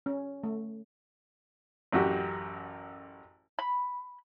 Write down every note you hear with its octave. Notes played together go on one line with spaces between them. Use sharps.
C#4
A3
A1 F#2 F#4 G4
B5